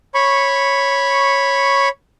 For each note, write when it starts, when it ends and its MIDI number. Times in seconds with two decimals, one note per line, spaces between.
0.14 1.89 73
0.14 1.89 83
0.14 1.89 85